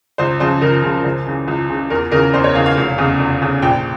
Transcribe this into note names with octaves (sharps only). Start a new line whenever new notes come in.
C#2 C5
C#3 F3 C5
C#2 A#4
C#3 F3
C#2 C5
C#3 E3
C#2
C#3 E3
E2 A#4
C#3 E3 A#4
E2 C5
C#5
C#3 E3 F5
F5
F1
E2 C#3
F1
E2 C#3
A#1 G5